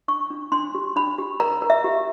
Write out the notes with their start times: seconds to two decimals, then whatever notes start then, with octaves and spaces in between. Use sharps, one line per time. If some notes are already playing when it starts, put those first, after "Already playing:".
0.08 D4 C#6
0.30 D4
0.52 D4 C6
0.75 G4
0.96 D4 B5
1.18 G4
1.40 A#4 A#5
1.62 A#4
1.70 E5
1.84 G4